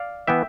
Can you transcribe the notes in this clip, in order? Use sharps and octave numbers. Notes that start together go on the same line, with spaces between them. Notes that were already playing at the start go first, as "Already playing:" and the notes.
Already playing: D5 F5
E3 B3 E5 G5